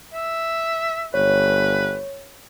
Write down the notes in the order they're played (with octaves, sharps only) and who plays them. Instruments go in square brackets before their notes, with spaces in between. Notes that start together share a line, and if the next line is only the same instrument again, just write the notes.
[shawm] E5
[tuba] G1 [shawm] B4 [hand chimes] C#5